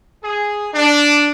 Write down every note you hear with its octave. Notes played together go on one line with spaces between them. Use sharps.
G#4
D4